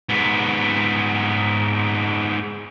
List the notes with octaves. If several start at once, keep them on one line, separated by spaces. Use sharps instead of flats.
G#2 B3